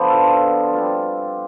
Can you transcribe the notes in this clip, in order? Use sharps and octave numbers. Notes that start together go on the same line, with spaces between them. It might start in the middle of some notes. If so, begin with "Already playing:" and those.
Already playing: D3 F3 B3 D4 C5 D5 G5
F4 A4
B2 G3 C4 F4